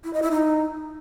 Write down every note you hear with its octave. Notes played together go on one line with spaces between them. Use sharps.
E4
D#5
E4
D#4